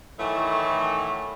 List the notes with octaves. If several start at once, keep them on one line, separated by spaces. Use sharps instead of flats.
A2 D#3 E3 F#3 A3